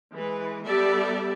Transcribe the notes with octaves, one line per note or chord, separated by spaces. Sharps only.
E3 G#3 B4
G3 B3 G4 A4 D5 E5